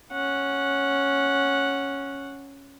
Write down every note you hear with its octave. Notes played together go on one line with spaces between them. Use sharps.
C#4 F#5